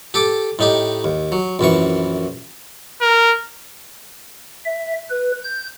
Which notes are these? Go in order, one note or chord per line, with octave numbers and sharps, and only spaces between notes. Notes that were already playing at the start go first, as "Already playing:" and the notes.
G4 A4 D6
A2 D#4 G4
D#2
F#3
A#1 F#2 E3 C#6
A#4
E5
B4
G6